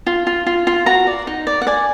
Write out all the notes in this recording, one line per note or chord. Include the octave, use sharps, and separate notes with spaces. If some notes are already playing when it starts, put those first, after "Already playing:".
F4
F4
F4
F4
F#4 A#5
D5
D#4
D5
F#5
D5 G#5